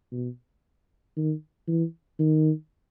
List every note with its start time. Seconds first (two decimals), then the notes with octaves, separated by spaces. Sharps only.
0.12 B2
1.16 D#3
1.67 E3
2.19 D#3